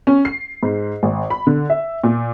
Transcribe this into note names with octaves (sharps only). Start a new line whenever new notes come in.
C#4
C7
G#2
G#1
B5
D3
E5
A#2